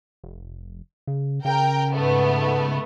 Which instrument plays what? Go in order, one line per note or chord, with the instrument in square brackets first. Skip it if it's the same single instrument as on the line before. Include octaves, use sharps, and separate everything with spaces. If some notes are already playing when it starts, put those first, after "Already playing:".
[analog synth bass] F1
C#3
[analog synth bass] C#3 [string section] A#4 G5
[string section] G#2 A3 B3